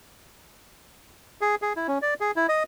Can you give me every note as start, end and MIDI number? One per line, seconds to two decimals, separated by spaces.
1.41 1.55 68
1.62 1.73 68
1.76 1.87 64
1.88 1.98 61
2.02 2.14 74
2.20 2.31 68
2.36 2.47 64
2.49 2.63 75